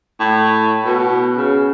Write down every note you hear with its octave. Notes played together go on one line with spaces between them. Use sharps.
A2
B2
C#3